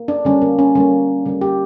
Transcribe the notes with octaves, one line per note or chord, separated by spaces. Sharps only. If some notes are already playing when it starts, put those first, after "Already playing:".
Already playing: A#3
D4
D3 G3 A#3 C#4
A#3
C#4
D3 G3 A#3 C#4
D3 G3 A#3
G4